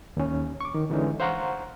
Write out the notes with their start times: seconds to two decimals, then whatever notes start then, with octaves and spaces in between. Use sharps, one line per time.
0.17 D#2 C#4
0.61 C#6 D6
0.74 D#3
0.90 D3 E3 G#3 C#4 D#4
1.20 C5 F5 F#5 A#5 C6 C#6